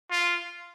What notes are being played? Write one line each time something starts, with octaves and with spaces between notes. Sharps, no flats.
F4